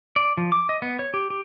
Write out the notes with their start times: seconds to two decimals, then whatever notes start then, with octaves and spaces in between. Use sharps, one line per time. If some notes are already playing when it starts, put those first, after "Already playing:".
0.16 D5
0.37 F3
0.52 D6
0.69 D#5
0.82 B3
0.99 C#5
1.14 G4
1.30 G4